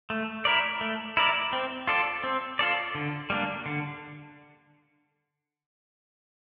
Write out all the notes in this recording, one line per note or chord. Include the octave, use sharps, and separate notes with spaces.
A3
E4 A#4 D5
A3
E4 A#4 D5
C4
F4 A4 D5
C4
F4 A4 D5
D3
G3 A#3 D4
D3